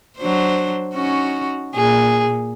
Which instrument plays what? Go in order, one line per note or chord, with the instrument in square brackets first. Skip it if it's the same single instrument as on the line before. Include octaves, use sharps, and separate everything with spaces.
[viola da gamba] F#3 D4 C5
C#4 D#4 F#4
[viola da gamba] A#2 [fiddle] G#4